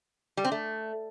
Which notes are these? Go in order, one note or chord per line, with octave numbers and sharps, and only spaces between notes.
G3
C4
A3